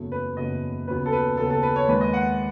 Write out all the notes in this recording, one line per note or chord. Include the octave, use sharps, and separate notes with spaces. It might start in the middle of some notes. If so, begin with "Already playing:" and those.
Already playing: F#1 E2 C#3 F#3 A3
B4
F#1 E2 C#3 F#3 A3 D#5
D#2 C#3 F#3 B3 B4
A4
B4
D#2 C#3 F#3 B3 A4
A4
B4
C#5
D#2 D#3 G#3 B4
D#5
F#5